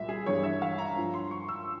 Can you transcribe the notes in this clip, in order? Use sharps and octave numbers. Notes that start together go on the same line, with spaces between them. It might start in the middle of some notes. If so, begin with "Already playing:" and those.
Already playing: C2 A#2 G3 E5
G#4
G2 E3 G3 C#5
E5
F5
A#5
G2 F3
C6
C#6
E6